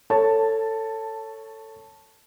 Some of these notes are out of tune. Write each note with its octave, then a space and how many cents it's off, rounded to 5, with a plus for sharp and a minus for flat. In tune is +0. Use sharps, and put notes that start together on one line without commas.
A4 +20 C#5 +0 A5 +0